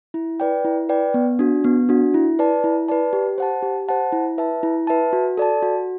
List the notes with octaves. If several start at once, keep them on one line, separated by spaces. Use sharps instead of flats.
E4
B4 D5 G5
E4
B4 D5 G5
B3
D4 F#4
B3
D4 F#4
E4
B4 D5 A5
E4
B4 D5 A5
G4
C5 F#5 A5
G4
C5 F#5 A5
E4
B4 E5 A5
E4
B4 E5 A5
F#4
A4 D5 A5
F#4